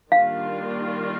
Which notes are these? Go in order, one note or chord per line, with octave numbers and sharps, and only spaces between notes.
D#3 G3 A#3 D4 F4 F5